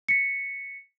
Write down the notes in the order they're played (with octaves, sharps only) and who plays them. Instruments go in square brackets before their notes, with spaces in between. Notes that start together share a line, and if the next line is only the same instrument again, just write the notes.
[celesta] B6 C#7